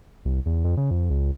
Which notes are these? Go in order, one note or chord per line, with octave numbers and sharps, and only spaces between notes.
C2
E2
F2
C#3
F2
C#2